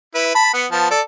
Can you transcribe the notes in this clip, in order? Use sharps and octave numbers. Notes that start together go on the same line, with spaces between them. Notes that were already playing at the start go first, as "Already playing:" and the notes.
E4 B4
A5 B5
B3 F#5
F3 B3 A5
A4 D5